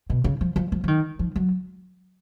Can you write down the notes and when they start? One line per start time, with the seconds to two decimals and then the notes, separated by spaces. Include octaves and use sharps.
0.10 B2
0.24 C#3
0.41 F3
0.56 F3
0.72 F3
0.84 F3
0.88 D#3
1.19 F3
1.36 F#3